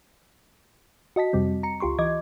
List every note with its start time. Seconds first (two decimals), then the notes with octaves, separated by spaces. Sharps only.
1.16 F#4 D#5 A5 B6
1.33 F2 C3 G3 C4
1.63 A#5 C#7
1.80 C#2 F4 G4 C6 C#6
1.99 E3 D#5 D6 G#6